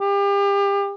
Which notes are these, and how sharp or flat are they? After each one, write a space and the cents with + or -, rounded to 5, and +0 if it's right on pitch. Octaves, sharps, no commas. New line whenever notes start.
G4 +35